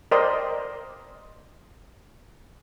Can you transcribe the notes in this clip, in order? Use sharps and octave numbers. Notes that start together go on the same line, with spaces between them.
A#4 C5 D5 D#5 G5 C6